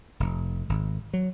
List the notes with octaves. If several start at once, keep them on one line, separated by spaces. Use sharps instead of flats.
F1
G#1
F#3